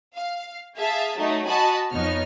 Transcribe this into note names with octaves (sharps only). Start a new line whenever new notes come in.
F5
G#4 E5 F5 A5
F#3 A3 D#4
F#4 D#5 G#5 A5 B5
F2 B3 D#4 C#5 F6